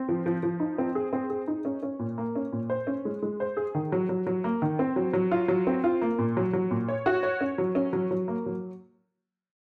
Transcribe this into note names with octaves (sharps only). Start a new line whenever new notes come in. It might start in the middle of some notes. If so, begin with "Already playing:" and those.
Already playing: C4
F3
F3
F3
D#4
C4
G#4
C4
G#4
D#4
C#4
C#4
A#2
A#3
C#4
A#2
C5
C#4
G#3
G#3
C5
G#4
D#3
F#3
F#3
F#3
A#3
D#3
C4
F#3
F#3
F4
F#3
C4
F4
A#3
A#2
F#3
F#3
A#2
C#5
F#4
C#5
C#4
F#3
C#4
F#3
F#3
A#3
F#3